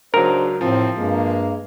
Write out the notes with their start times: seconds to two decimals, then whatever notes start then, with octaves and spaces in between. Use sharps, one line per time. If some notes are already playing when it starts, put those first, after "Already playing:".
0.14 C#2 G#2 F#3 D4 A#4 C5
0.61 A2 C3 F3 C4
0.96 G2 G#3 A#3